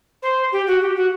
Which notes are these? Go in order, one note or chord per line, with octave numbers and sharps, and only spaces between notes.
C5
G4
F#4
G4
F#4